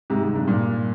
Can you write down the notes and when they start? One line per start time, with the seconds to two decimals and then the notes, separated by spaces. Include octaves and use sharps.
0.10 G#2 C3
0.23 G#2
0.36 G2
0.48 G2 A#2